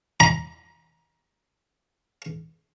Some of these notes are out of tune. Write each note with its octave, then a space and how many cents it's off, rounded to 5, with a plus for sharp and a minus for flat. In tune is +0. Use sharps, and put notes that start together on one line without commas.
A#5 +25